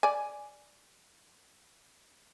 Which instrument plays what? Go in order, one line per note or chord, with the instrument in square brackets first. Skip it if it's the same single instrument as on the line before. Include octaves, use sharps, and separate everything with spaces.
[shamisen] D5 G#5